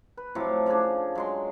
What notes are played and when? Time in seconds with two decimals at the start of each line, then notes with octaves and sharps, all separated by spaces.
0.17 B4
0.35 A2 C3 F3 F#3
0.66 C#3 F3 D4 G#4
1.15 F#3 G#3 C6